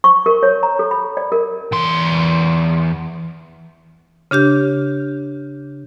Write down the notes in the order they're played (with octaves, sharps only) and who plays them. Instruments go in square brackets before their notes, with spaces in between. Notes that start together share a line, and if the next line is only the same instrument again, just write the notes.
[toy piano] C#6
A#4
C#5
A#5
A4
B5
D5
A#4
[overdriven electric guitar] E2 C6
[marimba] C#3 D4 G4 G6